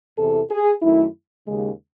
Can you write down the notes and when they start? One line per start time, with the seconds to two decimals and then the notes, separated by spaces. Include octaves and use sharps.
0.17 E2 C3 E3 A4
0.50 G#4
0.82 F#2 D#3 A3 E4
1.46 D#2 C#3 G#3